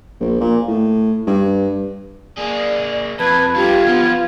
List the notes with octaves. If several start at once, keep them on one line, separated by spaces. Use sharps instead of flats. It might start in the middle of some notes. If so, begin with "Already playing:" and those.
A#1
A#2
A2
G2
A#3 G#4 D5
F2 B4 A5 G#6
D3 G3 F4 G4 G#6
F3 B3